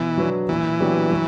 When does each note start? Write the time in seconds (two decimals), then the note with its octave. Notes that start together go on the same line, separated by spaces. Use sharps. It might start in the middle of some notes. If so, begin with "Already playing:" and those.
Already playing: B2 E3
0.18 F#3 B3 D4
0.49 A#2 E3
0.80 F#3 B3 D4 G4
1.11 F#3